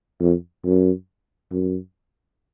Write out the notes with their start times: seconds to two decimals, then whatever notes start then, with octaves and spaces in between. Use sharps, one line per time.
0.20 F2
0.65 F#2
1.52 F#2